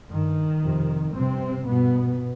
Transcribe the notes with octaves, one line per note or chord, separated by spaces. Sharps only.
G2 D#3
F2 C3
G2 C3 C4
G2 B2 B3